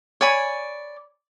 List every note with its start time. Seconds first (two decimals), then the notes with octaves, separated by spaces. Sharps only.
0.21 C#5 D5 G#5 B5